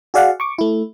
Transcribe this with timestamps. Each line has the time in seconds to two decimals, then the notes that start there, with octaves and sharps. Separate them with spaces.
0.14 F#4 G#4 D5 F5 F#5
0.40 C#6 D6
0.58 A3 E4